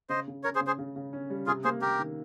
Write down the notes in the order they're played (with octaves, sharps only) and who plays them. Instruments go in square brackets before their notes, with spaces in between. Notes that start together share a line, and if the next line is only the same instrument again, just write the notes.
[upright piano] C#3 [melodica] C5 D#5
[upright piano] C#3
[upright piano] C#4 [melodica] A#4 C#5
[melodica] G#4 C5
[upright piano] C#3
[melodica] G#4 C5
[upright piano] C#3
C#3
C#4
G3
[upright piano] C3 [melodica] F4 G#4
[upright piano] A#3 [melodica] G#4 C5
[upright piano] A#3 [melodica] G4 A#4
[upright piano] D#3